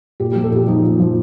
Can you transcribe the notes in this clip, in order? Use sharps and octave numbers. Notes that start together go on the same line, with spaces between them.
A#2 G4
G4
F3
A4
A#2 G4
F3 D#4
A#2
F3